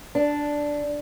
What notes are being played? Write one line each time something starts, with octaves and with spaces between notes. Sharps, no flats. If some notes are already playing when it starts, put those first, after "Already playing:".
D4